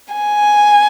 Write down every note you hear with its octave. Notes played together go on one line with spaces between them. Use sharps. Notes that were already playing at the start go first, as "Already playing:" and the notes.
G#5